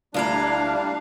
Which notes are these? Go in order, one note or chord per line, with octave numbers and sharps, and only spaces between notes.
D2 G3 D4 E4 F5 A#5